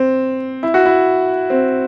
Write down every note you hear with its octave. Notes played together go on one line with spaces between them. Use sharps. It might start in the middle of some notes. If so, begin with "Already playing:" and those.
Already playing: C4
E4
F#4
E4
C4